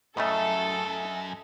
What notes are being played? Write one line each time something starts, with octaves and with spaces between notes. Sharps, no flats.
F#2 A2 C#3 A3 A4 D#5 E5